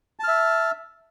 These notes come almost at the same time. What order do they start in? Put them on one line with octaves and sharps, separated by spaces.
A5 F6 E5